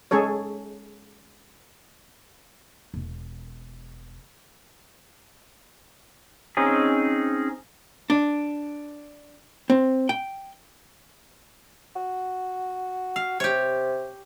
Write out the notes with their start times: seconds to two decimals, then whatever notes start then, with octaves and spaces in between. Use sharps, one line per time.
0.11 G#3 C#4 G#4 A4 C#5
2.94 E1 F4
6.57 C4 C#4 D#4 G#4
8.10 D4
9.70 C4
10.09 G5
11.96 F#4
13.16 F5
13.40 C3 G4 C#5